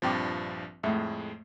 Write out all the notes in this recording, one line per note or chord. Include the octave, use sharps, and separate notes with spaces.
A#1 G2 F3 C4 G5 D6
F2 A2 G#3 A3 E5